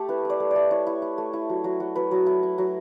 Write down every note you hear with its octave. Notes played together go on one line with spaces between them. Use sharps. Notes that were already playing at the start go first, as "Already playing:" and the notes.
Already playing: A3 G4 A4
E4 B4
E4 D5
A3
A3 D5
E4 C#5
E4
E4
A3
E4
F#3
F#3
F#3
F#3 B4
F#3
E4
E4
F#3